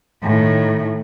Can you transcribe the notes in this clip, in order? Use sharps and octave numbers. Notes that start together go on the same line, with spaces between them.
A2 D#3